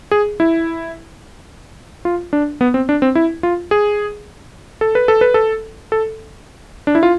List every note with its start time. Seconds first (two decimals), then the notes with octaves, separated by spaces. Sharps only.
0.11 G#4
0.40 E4
2.05 F4
2.33 D4
2.61 B3
2.74 C4
2.89 D4
3.02 C4
3.15 E4
3.43 F4
3.71 G#4
4.81 A4
4.95 B4
5.08 A4
5.21 B4
5.34 A4
5.92 A4
6.87 D4
6.95 E4
7.03 F4